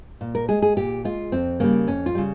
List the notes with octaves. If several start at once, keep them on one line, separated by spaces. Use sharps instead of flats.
A#2
A#4
G#3 G#4
G#4
A#2 G4
G#3 F4
F2 C4
C#3 G3 A#3
F2 C#4
F4
C#3 G3